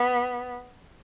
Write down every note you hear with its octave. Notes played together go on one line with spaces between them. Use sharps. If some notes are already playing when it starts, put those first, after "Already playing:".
Already playing: B3